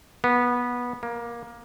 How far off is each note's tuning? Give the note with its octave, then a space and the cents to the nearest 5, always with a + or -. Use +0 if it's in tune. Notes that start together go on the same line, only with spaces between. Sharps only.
B3 -15
A#3 +15